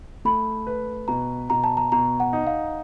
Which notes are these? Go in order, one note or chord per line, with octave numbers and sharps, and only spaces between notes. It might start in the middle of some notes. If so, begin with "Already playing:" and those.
A3 B5
B4
B2 A#5
B2 A#5
A5
A#5
B2 A#5
F#5
D#4
F5